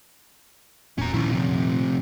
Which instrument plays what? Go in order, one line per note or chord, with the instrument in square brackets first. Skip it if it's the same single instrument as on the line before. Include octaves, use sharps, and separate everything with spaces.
[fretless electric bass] D#1 E2 A#2 [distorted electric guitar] C#4 A#5
[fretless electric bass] A#2 D#3 F3 [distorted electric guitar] C#4 E4
[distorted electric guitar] F2 C3